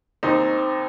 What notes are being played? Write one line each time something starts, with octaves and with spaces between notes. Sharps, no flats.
D#2 C4 D#4